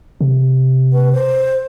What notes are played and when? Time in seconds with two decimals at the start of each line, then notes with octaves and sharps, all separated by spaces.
0.21 C3
0.93 B4
1.13 C5